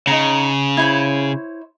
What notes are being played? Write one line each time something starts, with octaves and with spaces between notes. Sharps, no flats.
C#3 D#4 A#5
E4 C5 C#5